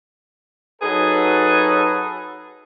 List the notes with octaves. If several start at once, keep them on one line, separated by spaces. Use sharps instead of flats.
F#3 D#4 G#4 A4 B4